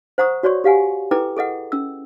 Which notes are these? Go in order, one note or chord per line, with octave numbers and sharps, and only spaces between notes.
C5 F#5 A#5 C#6 D#6
F#4 C#5 D5 C6 C#6
G4 F5 F#5 G#5
E4 A4 B4 G5 A#5 D6
G#4 A4 D#5 F#5
C#4 E6